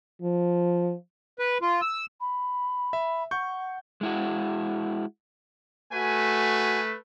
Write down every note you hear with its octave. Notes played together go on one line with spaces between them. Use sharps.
F3
B4
F4
E6
B5
E5
F#5 C#6 G6
G#3 E4 F#4
A3 F#4 B4 G#5